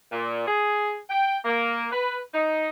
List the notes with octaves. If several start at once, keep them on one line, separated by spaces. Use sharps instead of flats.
A#2
G#4
G5
A#3
B4
D#4